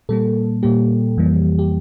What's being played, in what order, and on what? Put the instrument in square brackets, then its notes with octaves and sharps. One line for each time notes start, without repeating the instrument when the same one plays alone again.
[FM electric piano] A#2 G3 A#3 A4
A#2 G3 A#3 G4
F2 E3 G3 A#3
G4